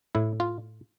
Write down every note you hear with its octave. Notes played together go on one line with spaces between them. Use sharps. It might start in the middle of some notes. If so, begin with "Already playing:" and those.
A2 E4
F4